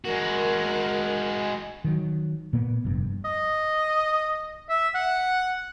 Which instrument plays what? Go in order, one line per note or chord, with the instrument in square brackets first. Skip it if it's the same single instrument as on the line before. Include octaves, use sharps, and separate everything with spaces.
[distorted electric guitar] G#3 F#4 [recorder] A#4
[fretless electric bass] D#3 F#3
A#2 A#3 B3
F1 G2
[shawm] D#5
E5
F#5